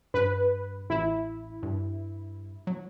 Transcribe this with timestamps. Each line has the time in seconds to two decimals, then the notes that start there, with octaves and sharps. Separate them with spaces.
0.14 G2 B4
0.90 A1 E4
1.63 G2
2.67 F#3